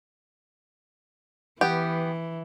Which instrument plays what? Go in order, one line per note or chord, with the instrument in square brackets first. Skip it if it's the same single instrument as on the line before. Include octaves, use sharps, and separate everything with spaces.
[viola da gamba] E3 [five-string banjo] B3 G4